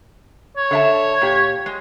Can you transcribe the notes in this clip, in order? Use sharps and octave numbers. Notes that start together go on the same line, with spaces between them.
C#5
D3 E5 A5
A#2 G4
G#3